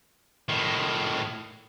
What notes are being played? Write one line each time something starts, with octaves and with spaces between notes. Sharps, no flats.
A2 D#3